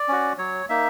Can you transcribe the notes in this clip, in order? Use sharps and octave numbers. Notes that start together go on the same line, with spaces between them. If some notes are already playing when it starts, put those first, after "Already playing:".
Already playing: D5
C#4 F#4
F#3 C#5
A#3 D#4 E5